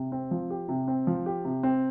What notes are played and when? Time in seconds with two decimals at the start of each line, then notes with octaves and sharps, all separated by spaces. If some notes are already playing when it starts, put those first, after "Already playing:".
Already playing: C3
0.12 C4
0.31 F3
0.50 G4
0.69 C3
0.88 C4
1.07 F3
1.26 G4
1.45 C3
1.63 C4